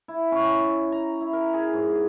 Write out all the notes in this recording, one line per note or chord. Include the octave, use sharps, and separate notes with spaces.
E4
C#4
A#5
E4
A#4
G#4
G#2